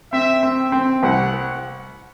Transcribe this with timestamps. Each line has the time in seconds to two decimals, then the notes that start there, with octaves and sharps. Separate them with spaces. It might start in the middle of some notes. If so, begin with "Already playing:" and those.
0.13 C4 E5
0.43 C4
0.72 C4
1.03 C2 F#5